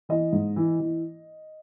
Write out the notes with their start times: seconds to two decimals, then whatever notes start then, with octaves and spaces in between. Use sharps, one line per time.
0.09 E3 D#5
0.33 G#2
0.56 E3
0.80 E3